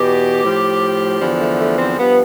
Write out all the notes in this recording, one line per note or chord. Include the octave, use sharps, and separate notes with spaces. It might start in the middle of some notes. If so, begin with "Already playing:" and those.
Already playing: E2 B2 G4
A2 F3
E2 D3 F3
A3
A3
C4
G2 F3 B3